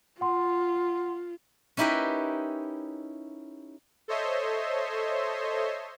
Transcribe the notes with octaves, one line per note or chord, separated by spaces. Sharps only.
F4 F#5 C6
C#4 D#4 E4 G4 A#4 B4
A4 C5 C#5 D#5 E5 C6